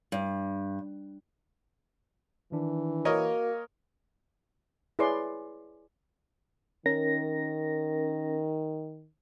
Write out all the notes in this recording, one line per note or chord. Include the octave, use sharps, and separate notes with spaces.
G2
D#3 E3 D4
A#3 F#4 A#4 C#5 D#5
E4 G#4 B4 C#5 D5 C6
D#3 C#4 A#4 A#6